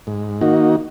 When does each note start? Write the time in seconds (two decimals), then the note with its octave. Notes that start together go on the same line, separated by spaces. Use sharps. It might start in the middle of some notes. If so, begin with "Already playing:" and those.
0.07 G#2
0.41 D#3 A#3 D#4 F#4